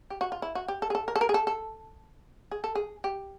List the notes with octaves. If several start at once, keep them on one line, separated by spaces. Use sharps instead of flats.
G4
F#4
F4
E4
F#4
G4
A4
G#4
A4
A#4
A4
A#4
G#4
A4
A4
G#4
A4
G#4
G4